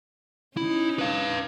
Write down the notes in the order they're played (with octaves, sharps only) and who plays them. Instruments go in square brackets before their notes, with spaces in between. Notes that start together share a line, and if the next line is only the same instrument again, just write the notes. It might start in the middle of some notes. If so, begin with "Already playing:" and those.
[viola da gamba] C#4 D#4 [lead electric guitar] E4
[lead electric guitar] B4 F5